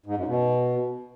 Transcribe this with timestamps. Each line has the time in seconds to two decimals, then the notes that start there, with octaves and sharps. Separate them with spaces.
0.06 G#2
0.17 F#2
0.28 B2